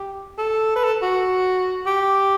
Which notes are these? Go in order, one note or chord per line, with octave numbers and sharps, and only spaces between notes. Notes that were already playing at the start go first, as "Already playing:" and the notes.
Already playing: G4
A4
B4
A4
F#4
G4